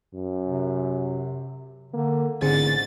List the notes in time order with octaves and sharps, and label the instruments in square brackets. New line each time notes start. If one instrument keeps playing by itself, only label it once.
[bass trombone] F#2
[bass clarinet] C3
[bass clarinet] D3 [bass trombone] A#3
[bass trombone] A1 [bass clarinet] G#2 [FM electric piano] D3 C4 G#4 [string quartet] A6